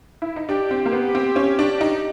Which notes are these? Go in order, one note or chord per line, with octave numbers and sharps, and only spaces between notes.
E4
D#4
D4 G4
C4
A#3
B3
C4
C#4
D4
D#4